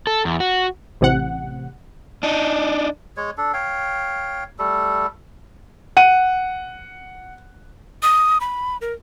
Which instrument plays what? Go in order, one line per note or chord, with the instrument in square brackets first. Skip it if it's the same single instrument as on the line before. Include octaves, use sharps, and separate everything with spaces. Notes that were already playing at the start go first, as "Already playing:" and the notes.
[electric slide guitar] A4
E2
F#4
[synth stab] A1 C3 F#5
[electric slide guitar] D4 D#4
[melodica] G#3 C#5
D4 A4
C#5 F5 G5
G3 A3 A4
[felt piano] F#5 D#7
[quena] D#6
B5
A#4